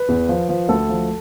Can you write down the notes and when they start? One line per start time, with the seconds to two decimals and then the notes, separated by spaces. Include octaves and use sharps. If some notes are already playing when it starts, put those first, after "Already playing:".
Already playing: B4
0.08 E2
0.29 F3
0.49 F3
0.69 D2 A4
0.89 F3